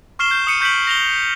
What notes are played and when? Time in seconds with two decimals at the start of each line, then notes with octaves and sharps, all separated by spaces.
0.19 C#6 F6 C7 E7 G7
0.31 G6
0.47 D#6 C#7 D#7
0.61 C#6 G6 B6 D7 F#7
0.87 A#6 F7 G7